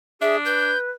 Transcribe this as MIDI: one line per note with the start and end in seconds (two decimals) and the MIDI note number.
0.21 0.72 62
0.21 0.37 68
0.21 0.36 76
0.45 0.91 71
0.45 0.78 91